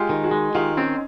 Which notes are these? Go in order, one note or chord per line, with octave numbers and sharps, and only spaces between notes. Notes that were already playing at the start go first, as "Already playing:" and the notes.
Already playing: G#3 F4 G4
D#3
F#4 G#4
G#3
D#3 F4 G4
C4 C#4 D#4